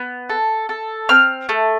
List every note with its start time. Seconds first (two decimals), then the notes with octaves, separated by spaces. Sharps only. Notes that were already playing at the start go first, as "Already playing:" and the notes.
Already playing: B3
0.30 A4
0.69 A4
1.09 C4 F6
1.49 A3